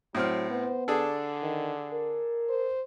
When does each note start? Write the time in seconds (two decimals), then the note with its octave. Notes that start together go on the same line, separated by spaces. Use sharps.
0.15 A2 F#3 C4 F6
0.50 B3 C5
0.88 D3 D4 G#4 A4
1.42 D#3
1.92 A#4
2.49 C5